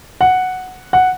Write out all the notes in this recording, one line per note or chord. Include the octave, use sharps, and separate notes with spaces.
F#5
F#5